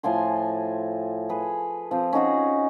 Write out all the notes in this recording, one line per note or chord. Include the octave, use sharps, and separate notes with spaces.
A2 F3 G#5 C6
G#4 B4
F3 C4
C#4 D#4 F#4 G#4